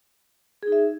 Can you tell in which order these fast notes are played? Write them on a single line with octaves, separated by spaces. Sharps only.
G#4 D#4 E5